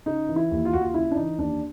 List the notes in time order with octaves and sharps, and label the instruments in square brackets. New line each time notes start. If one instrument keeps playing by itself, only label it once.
[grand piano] C#3 D#4
E3
E4
D#2
F4
D#2 F#4
F4
C#3 E4
D4
E3 D#4
D#2 D4